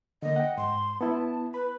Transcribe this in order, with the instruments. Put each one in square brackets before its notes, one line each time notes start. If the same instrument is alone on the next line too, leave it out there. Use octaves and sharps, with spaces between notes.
[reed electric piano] D3 A#3 [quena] D#5
[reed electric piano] F#5 G5
[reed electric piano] G#2 [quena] C6
[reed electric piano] B3 E4 [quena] A5
[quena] B4 [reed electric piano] B5